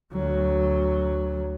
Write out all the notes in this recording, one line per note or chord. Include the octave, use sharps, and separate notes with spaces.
D2 F#3